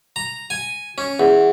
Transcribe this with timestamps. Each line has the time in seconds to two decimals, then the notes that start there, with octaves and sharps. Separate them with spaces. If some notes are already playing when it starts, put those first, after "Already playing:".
0.16 A#5
0.50 G#5
0.98 C#4
1.20 E2